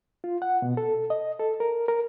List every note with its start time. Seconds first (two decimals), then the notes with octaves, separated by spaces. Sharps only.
0.24 F4
0.42 F#5
0.62 B2
0.77 A4
1.10 D#5
1.39 A4
1.60 A#4
1.88 A#4